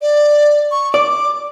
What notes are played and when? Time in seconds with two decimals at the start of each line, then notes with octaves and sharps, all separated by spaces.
0.02 D5
0.71 C#6
0.94 D5 D6